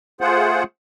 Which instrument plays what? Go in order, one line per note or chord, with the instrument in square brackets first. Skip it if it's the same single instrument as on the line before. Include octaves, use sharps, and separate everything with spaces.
[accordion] A3 F4 G#4 C5 F#5